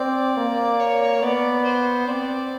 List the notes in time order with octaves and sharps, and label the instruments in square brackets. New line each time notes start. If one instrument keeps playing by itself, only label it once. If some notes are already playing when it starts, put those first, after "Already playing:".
Already playing: [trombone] C4 [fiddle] D5
[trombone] A#3
[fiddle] C#5
[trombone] B3 [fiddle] D5
[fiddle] C5
[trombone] C4 [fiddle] D5